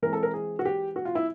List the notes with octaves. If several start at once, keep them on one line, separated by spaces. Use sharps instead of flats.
E3 G#3 C4 A#4
A4
A#4
G#4
F#4
G4
F#4
F4
E4